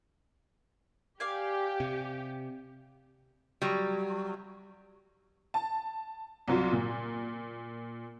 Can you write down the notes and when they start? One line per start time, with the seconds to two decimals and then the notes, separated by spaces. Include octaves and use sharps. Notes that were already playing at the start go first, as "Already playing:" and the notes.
1.20 G4 D5 F5 G#5
1.80 C3
3.62 F#3 G3
5.54 A5
6.48 C2 F#3 F4
6.73 A#2